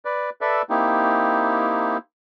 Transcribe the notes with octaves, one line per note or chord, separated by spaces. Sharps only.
B4 D5
A4 B4 D5 E5
A#3 C4 D#4 E4 G4